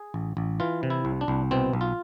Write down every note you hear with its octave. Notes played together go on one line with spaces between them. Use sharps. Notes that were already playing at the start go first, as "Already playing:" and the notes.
Already playing: G#4
A1
A1
E3 F4
C3
E4
C2
D4
C2
B2 C4
B1
F4